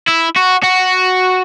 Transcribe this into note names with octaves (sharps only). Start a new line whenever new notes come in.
E4
F#4
F#4